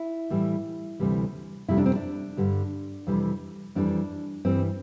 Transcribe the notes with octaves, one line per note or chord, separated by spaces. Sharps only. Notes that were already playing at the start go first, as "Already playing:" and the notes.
Already playing: E4
A2 E3 G3
D2 C3 E3 G3
F2 C3 G3 E4
D4
C4
D4
G2 D3 G3
F2 C3 E3 G3
F2 E3 G3 D4
G2 E3 G3 C4